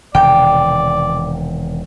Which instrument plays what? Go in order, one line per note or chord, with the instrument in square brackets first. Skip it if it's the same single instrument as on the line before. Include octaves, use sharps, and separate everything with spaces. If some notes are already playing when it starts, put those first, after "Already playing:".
[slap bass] E1 C3 D#3 [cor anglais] D5 [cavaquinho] G5